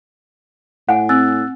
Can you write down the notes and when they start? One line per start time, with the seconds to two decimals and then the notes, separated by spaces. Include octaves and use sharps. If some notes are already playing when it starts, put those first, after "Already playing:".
0.89 A2 F#5 G#5
1.09 C4 E6 F#6 A6